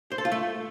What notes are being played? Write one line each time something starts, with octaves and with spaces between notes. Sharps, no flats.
C5
A4
F4
A3